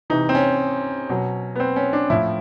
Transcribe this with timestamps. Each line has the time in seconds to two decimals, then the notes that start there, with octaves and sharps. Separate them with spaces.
0.10 C3 E3 D#4
0.29 C4
0.35 C#4
1.09 B2 F#3
1.56 B3
1.60 C4
1.76 C#4
1.93 D4
2.10 A2 F3 E4